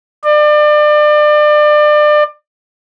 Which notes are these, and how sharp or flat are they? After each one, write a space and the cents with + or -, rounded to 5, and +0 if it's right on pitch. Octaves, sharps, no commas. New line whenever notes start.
D5 +30